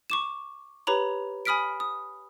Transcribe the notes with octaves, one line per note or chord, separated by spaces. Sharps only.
C#6 D6 E7
G4 B4 C#5 A#5 B5
G#5 B5 D#6 F6 B6 D7
D#6